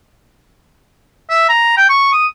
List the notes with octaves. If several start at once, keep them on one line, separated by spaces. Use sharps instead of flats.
E5
A#5
G5
C#6
D#6